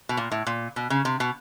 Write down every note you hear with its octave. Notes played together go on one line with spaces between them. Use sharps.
B2
A#2
A2
A#2
B2
C#3
C3
B2